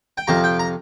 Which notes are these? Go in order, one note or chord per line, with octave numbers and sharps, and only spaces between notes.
G5
F2 C3 F3 A#5
G5
A#5